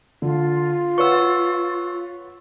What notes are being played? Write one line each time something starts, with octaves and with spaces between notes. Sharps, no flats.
D3 F4
B4 C#5 F#5 C#6 E6